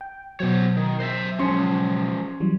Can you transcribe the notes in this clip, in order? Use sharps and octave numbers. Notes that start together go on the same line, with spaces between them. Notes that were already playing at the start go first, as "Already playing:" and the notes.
G5
B2 F#3 B3 C5 C#5
D#3
C5 D#5 E5
F3 G#3 C#4 C6 C#7
E3 F#3 G3